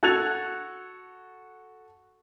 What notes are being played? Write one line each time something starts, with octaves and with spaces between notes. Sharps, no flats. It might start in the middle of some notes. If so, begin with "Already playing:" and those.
F#4 A4 F#6 G#6 A6 F7